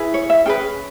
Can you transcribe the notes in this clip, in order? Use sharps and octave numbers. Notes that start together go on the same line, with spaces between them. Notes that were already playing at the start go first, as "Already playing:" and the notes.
Already playing: E4 G#4 B4
C#5
E5
C#4 G#4 B4 G5